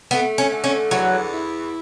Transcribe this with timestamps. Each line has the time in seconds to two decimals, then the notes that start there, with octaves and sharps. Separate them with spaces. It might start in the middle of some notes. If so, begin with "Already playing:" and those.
0.11 A3 B3
0.38 C#4
0.51 D3
0.64 C#4
0.91 E2 F#3
1.31 E4